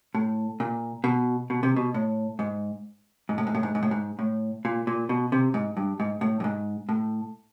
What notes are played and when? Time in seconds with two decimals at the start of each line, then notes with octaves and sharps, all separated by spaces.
0.15 A2
0.60 A#2
1.04 B2
1.50 B2
1.63 C3
1.76 B2
1.94 A2
2.39 G#2
3.29 G#2
3.38 A2
3.47 G#2
3.55 A2
3.63 G#2
3.75 G#2
3.83 A2
3.91 G#2
4.19 A2
4.65 A#2
4.87 A#2
5.09 B2
5.32 C3
5.54 G#2
5.77 G2
6.00 G#2
6.21 A2
6.40 G2
6.44 G#2
6.89 A2